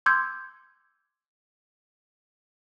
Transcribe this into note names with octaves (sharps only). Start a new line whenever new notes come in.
C6 D6 E6 G6 G#6